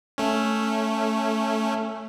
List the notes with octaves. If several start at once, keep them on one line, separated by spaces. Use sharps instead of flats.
A3 C#4